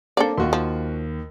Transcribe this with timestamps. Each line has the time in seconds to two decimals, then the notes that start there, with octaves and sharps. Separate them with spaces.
0.17 A#3 C4 D4 A4 D5
0.38 D#2 F4 F#4 C6
0.53 F3